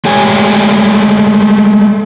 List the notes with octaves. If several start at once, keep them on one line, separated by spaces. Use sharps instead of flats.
G#3 A3 G4 C#5 G#5